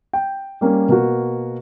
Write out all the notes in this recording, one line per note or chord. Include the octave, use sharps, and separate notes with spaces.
G5
G3 A#3 C#4
B2 A#3 F#4